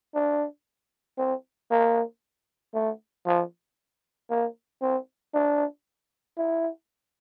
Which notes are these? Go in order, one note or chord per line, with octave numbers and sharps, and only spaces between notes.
D4
C4
A#3
A3
F3
A#3
C4
D4
E4